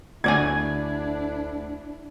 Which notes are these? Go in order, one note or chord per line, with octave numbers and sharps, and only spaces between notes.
D2 D4 E4 F#4 D5 G#5 G#6